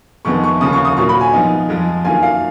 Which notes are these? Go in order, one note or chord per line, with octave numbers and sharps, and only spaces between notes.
F2 D#3 G#3 B3 C#6
C#6
D#2 C#3 F3 D#6
C#6
D#6
A#2 F#3 A#3 F4 C#6
B5
G#5
G#2 F3 B3 D#4
F2 F3 G#3
F#2 D#3 A#3 F4 G#5
F5